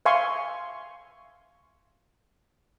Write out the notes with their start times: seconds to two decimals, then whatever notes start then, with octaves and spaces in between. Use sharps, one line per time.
0.06 E5 F5 G#5 C6 C#6